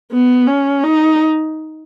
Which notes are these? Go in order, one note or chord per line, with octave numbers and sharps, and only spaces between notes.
B3
C#4
D#4